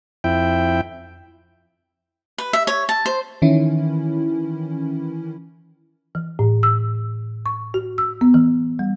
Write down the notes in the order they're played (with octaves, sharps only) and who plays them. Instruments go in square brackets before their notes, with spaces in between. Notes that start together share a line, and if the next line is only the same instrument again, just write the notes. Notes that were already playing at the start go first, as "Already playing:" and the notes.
[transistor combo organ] F2 E4 G5
[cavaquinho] B4
E5
C#5
A5
C5
[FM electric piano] D#3 E3 C#4 E4
[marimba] E3
A2
E6
C#6
F#4
E6
B3
E3
G3